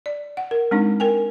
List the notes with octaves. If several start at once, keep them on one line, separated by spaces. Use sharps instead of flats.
D5
F#5
A#4
G#3 C4 D4 D#4
A#4 G5 G#5